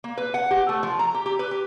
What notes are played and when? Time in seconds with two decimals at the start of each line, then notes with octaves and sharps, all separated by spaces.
0.04 A#3
0.18 B4
0.34 F#5
0.51 G4
0.69 A3
0.83 F3
0.99 A#5
1.14 G4
1.26 G4
1.39 B4
1.51 G4